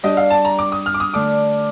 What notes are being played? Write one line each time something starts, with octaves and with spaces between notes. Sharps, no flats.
G3 D4 G4 D#5
F5
A5
A#5
D6
D#6
F6
D6
D#6
D3 A3 D4 D6